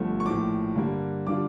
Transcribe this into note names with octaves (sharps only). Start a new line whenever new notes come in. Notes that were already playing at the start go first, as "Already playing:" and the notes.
Already playing: G1 G2 F3 A3
C#6
A#1 A2 F3 D6
G2 D3 G3 A#3
D3 G3 D4 F4 D6